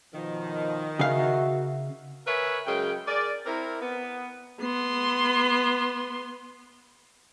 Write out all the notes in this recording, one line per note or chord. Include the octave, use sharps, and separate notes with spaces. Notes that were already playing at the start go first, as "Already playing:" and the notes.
B2 D#3 F3
C#3 F#4 E5 F5
A#4 B4 C#5 E5 G#5
F#2 C#3 G#3 G5
G#4 A#4 D5
C4 E4 A#4
B3
B3 C6